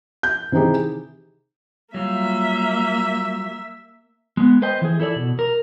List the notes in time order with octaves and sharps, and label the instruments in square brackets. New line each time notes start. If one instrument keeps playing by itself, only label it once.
[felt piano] G6
C3 D#3 E3 D#4 G4 G#4
[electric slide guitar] F#3 G3 F4 [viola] A#3 E5
[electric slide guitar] G#3 B3
B4 C5 D#5 G5
E3 G#4
E4 A4 C#5 D5
B2
A#4